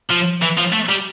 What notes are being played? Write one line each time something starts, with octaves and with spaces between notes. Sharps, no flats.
F3
E3
F3
A3
G3